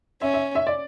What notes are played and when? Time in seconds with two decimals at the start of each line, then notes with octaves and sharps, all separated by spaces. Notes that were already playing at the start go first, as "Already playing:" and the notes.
0.21 C#4 E5
0.34 E5
0.55 E5
0.67 D5